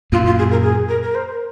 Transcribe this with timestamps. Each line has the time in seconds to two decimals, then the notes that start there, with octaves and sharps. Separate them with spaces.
0.12 F#2 A#2 F4
0.26 F4
0.39 G#4
0.51 A#4
0.63 G#4
0.89 A#4
1.03 A#4
1.15 C5
1.30 A#4